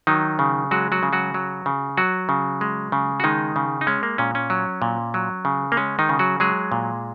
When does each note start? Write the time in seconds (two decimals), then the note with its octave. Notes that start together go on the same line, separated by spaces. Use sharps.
0.07 D#3 F#3 D#4
0.39 C#3
0.71 F#3 G#3 F#4
0.92 F#3 F#4
1.03 C#3
1.13 F#3 F#4
1.34 F#3
1.66 C#3
1.97 F#3 F#4
2.29 C#3
2.61 G#3
2.92 C#3
3.20 F#4
3.24 D#3 G#3 D#4
3.56 C#3
3.81 D#4
3.87 G#3 C#4
4.03 A#3
4.18 A#2 C#4
4.35 C#4
4.50 F#3
4.82 A#2
5.14 F#3
5.45 C#3
5.72 A#3
5.77 G#3 C#4
5.99 D#3 D#4
6.09 C#3
6.19 F#3 F#4
6.40 F#3 G#3 G#4
6.72 A#2